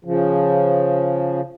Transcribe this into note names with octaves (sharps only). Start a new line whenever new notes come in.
C#3 F3